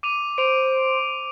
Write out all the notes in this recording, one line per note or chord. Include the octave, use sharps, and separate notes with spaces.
D6 D#7 F7
C5 D7 F7